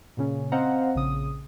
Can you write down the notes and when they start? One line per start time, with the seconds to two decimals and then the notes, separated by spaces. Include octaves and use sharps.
0.17 A#2 C#3 C#4
0.52 C4 C5 D#5 F5 F#5 A#5
0.95 A#1 C#3 D#6